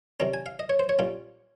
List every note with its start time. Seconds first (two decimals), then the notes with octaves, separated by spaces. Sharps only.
0.20 C3 D#3 G3 C#4 A#5
0.34 G#5
0.46 F5
0.59 D#5
0.69 C#5
0.79 C5
0.89 C#5
0.99 A#2 G3 C#4 F4